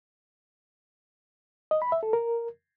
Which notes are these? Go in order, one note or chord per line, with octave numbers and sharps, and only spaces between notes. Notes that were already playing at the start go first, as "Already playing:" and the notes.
D#5
B5
E5
A4
A#4